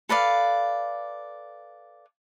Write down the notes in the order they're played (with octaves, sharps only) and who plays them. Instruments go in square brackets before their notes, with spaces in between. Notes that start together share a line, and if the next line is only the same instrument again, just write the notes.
[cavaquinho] A4 B4 D5 F5